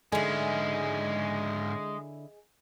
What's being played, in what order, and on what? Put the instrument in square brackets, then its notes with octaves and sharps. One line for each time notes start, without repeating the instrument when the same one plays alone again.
[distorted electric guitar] G#2 C#4 [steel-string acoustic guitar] D3 E4 [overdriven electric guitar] G#3 [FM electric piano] G#4 D#5 G#5